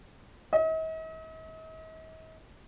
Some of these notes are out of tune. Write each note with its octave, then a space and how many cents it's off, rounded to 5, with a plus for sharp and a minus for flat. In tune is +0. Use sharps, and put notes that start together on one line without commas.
D#5 +45